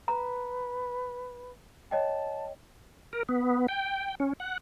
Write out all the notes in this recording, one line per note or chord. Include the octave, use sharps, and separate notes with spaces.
B4 A#5
C#5 D#5 G5 A5
A#4
B3
G5
C#4
F#5